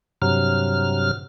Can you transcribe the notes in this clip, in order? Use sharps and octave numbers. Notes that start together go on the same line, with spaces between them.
G2 C3 F#3 F6